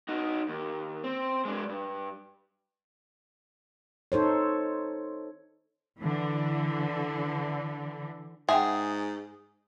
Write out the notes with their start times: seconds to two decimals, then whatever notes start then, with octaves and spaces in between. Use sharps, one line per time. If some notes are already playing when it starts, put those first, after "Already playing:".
0.09 D#4 F#4
0.49 D#2
1.04 C4
1.45 G#3 D4
1.69 G2
4.12 D#4 A4 C5 C#5
5.99 D3 E3
8.49 G#2 G#4 E5 F#5 G5